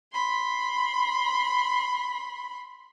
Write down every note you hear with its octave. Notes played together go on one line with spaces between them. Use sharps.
B5 C6